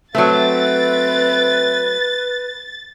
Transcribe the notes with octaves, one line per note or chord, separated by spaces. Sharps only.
F#3 A3 C4 B4 E5 A6